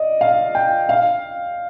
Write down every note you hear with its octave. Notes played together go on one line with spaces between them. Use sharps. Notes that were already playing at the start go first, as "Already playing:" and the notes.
Already playing: D5 D#5
F5
G5
F5